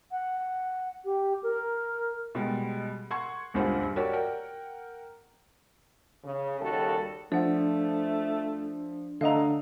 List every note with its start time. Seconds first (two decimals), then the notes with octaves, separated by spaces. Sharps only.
0.11 F#5
1.05 G4
1.43 A#4
2.35 B2 G3 G#3
3.11 F#5 C6 C#6 G#6
3.54 D#1 C#2 G2 F4 C5 F#5
3.96 F#4 G4 A#4 C#5 D5
4.13 A#4 F#5 G5
6.25 C#3
6.61 D#2 C#3 G3 F#4 A4
7.32 F3 A3 D4 D5 F#5
9.21 D3 A3 D#5 F5 A#5